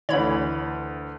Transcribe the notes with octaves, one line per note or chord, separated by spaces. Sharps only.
D2 E3 C#5 B5